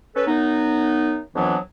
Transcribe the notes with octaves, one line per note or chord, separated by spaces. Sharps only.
C#4 A4 B4
F#2 B3 D#4
F2 E3 F#3 B3 D4